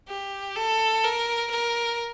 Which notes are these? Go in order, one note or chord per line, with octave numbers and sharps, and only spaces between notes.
G4
A4
A#4
A#4